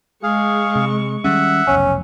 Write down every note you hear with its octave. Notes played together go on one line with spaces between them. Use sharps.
G#3 G#4 F5 C#6
C3
D#3 G3 C#4 E5 F#5
F1 B1 C#4